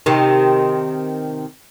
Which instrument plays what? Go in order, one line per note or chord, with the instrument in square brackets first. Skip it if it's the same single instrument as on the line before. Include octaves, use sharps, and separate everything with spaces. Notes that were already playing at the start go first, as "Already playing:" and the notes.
[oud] C3 D#3